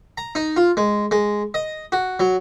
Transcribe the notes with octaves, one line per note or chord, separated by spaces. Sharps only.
A#5
D#4
F4
G#3
G#3
D#5
F#4
F#3